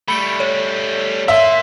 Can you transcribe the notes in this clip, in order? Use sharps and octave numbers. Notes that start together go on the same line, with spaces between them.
G3 A3 B5 C#7 D7
C#5
A#4 E5 C6